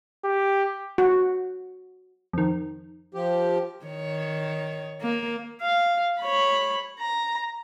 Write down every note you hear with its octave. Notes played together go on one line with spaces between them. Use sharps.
G4
F#4
F2 D#3
F3 G4
D#3 C#5
A#3
F5
C#5 B5
A#5